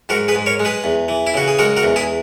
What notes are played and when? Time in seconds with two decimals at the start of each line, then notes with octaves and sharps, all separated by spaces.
0.09 G#2 F#4 A#4
0.28 G#4 B4
0.35 G#2
0.46 A#4 C#5
0.60 G#3
0.65 G#4 B4
0.84 E2
1.08 E3
1.27 E4
1.34 C#3 F#4
1.48 G#4
1.59 G#3 F#4 A#4
1.77 F#4 A#4
1.83 E2
1.96 E4 G#4